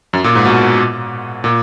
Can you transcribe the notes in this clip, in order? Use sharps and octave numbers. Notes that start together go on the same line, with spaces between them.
F#2
A#2
G#2
B2
A#2